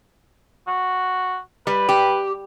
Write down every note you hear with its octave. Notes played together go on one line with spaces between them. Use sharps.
F#4
G3 B4
G4